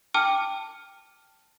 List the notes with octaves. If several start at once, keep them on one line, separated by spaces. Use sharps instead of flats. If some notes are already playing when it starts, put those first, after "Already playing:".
G5 A5 D6 F6